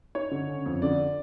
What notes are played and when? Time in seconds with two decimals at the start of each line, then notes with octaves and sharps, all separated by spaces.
0.15 D#4 C#5
0.31 D3
0.49 C#3
0.66 F2
0.82 D3 D5